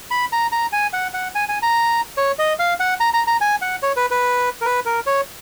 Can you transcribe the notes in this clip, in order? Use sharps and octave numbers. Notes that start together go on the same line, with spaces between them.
B5
A#5
A#5
G#5
F#5
F#5
G#5
G#5
A#5
C#5
D#5
F5
F#5
A#5
A#5
A#5
G#5
F#5
C#5
B4
B4
A#4
B4
A#4
C#5